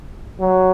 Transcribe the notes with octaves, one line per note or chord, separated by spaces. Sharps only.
F#3